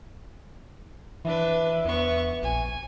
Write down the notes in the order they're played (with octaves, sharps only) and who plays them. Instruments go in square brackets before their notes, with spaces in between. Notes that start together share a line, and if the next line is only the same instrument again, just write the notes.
[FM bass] E3 [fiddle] D4 B4 [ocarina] E5
[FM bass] E2 [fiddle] B3 C#6
[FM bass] A#1 [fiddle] G#5